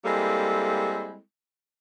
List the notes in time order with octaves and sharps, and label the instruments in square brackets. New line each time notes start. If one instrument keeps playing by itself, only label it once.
[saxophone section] G3 G#3 A#3 C4 E4 A4